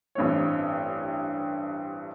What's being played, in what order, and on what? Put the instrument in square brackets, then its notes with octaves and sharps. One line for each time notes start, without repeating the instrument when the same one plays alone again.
[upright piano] A1 G2 C4 C#5